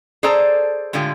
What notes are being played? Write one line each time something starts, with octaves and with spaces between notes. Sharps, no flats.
G#4 A4 C5 D5 A5 A#5
A2 D3 G#3 F4 G4